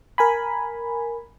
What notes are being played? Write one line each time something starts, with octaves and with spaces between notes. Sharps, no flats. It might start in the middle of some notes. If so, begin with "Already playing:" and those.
A#4 G#5 B5